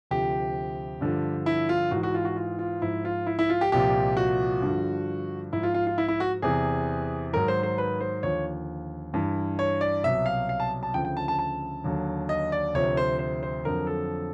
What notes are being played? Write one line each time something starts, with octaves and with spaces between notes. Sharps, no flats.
D2 C3 F3 G4
G2 D3 F3
E4
F4
G#2 E3 F#4
F#4
F4
F#4
F4
F4
G#2 F3 E4
F4
E4
E4
F4
G4
C2 A#2 F3 G4
F#4
G2 D3 F3
G#2 F3 E4
F4
F4
F4
E4
E4
F#4
E2 C3 E3 G#4
G#2 D#3 F#3 A#4
C5
C5
B4
C5
D#2 D3 F3 C#5
G2 E3
C#5
D5
C2 B2 F#3 E5
F5
F5
A5
A5
D2 C#3 F3 G5
G5
A5
A5
A5
D#2 D3 F#3
D#5
D5
D2 C3 F3 C#5
C5
C5
C5
F2 D3 F#3 A#4
A4